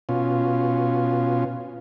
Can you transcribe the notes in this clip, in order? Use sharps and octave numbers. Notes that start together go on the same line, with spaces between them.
B2 C#4 F4